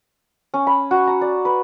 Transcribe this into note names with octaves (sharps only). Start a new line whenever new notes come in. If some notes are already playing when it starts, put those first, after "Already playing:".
C#4
B5
F#4
A#5
D5
B4